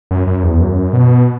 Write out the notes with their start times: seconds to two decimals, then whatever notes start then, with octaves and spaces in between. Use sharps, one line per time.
0.11 F#2
0.27 F#2
0.43 E2
0.61 F#2
0.93 B2